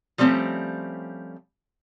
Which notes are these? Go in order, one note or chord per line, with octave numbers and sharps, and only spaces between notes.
F3 G3 A3 C4 C#4